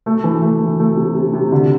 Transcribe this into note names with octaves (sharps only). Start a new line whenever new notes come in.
A3
E3
A3
E3
A3
C3
C3
C3
D3